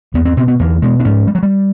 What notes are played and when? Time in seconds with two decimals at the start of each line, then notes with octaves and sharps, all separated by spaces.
0.14 E2 B3
0.25 C4
0.37 B2 C4
0.48 B3
0.59 E2 A#3
0.82 B2 G#3
1.00 D4
1.05 G#2 C#4
1.27 G3
1.35 F#3
1.43 G3